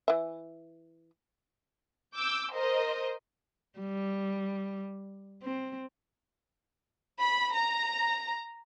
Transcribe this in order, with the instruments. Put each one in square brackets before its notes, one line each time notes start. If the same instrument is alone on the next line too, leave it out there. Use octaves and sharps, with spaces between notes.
[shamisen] E3 E5
[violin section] D6 E6 G6
A#4 C5 D#5
[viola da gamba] G3
C4
[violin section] B5
A#5